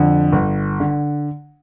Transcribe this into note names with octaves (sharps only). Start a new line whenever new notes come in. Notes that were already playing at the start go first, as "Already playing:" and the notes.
Already playing: F2 D3
G1
D3